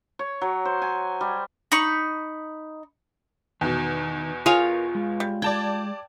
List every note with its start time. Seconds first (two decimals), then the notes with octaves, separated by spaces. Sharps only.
0.19 C#5
0.42 F#3
0.65 C5
0.82 G#5
1.21 G3
1.72 D#4 B5 C#6
3.61 E2 B2 D#3
4.46 F4 G#4 A#4 C#5 F5
4.95 G#3
5.20 G3
5.42 D5 G5 A5 G#6